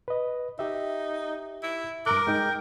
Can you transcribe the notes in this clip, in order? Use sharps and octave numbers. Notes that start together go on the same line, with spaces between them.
B4 D#5
D#4 G4 E5
E4
G2 A#4 A#5 D6 F#6
G#3 D#4 G5